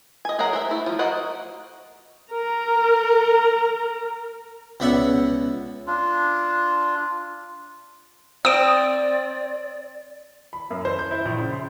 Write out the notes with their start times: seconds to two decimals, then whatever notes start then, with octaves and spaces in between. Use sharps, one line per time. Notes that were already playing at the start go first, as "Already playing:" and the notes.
0.25 D#5 G#5
0.39 F#3 G#4 A#4 F#5 A#5
0.53 C5 E5
0.71 A3 E4
0.86 F3
0.99 F4 F#4 A#4 D#5 F#5
2.31 A#4 A#5
4.80 C#2 B3 D5 E5 F#5
5.87 D4 F4
8.45 C4 D5 D#6 D7
10.53 B5
10.70 F#2
10.85 C5
10.99 G6
11.11 E4
11.25 A#1
11.38 C#3
11.52 C6